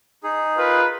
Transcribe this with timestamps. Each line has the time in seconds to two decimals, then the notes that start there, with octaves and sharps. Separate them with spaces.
0.24 D#4 G#4
0.57 F4 A#4 B4